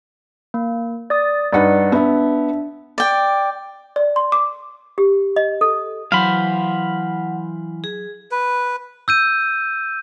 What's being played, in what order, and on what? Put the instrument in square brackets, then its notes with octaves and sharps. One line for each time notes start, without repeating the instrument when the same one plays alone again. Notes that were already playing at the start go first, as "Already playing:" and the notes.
[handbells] A#3
D5 D#6 A6
[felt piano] G2 D#4 B4 [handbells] D5 F#5
[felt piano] B3 [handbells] D4 E5
[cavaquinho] D5 G5
[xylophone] D5
C6
D6
[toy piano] G4
D#5
A4
[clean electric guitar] E3 C5 [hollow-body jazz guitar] F#3 A5 [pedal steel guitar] F5 B5 [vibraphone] F#5
[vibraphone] G#4
[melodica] B4
[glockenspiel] E6 G6 D#7